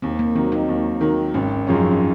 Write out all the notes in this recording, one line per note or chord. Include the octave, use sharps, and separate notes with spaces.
D#2 C4
A#3
D#3 F#3 C4
D#4
D#2
D#3 F#3
G#1 C#4
F#2 F3 G#3 C#4